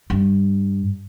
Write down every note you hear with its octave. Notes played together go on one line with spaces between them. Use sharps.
G2